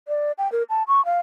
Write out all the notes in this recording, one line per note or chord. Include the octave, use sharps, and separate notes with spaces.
D5
G5
A#4
A5
C#6
F5